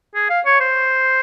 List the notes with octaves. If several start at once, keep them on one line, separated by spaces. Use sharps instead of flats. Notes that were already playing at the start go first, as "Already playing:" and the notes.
G#4
F5
C#5
C5